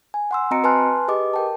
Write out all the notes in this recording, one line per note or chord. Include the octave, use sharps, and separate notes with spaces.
G#5
F#5 C6 E6
C4 F#4 D#5 A#5 C#7 D7
B4 G#5 A5 C6 F6 F#6
G4 G#4 B4 D#5 D6
A#4 G5 A5